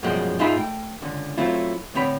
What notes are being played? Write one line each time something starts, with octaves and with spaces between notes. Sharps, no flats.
F#2 B2 F3 G3 G#3
G#2 D#4 F4 G#4 E5 B5
A3 G5
C#2 D3
F#3 A3 C4 E4 F4
A2 D3 C4 C#5 B5